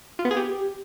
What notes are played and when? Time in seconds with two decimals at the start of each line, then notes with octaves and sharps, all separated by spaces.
0.19 F4
0.25 B3
0.31 G#4
0.37 G4